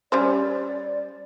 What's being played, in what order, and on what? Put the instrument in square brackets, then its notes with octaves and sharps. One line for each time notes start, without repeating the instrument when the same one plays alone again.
[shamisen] G3 C#4 C5 [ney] D5